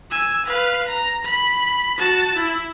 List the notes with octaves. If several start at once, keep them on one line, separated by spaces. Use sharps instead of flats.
G#5 E6
B4 F5
A#5
B5
F#4 A5
E4